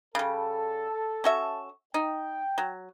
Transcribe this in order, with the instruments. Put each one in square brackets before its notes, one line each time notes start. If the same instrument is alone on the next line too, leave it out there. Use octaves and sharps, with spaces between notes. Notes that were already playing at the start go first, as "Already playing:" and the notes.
[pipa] C#3 G3 [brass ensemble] A4
[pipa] C#4 F#4 E5
[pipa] D#4 [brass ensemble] G5
[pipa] F#3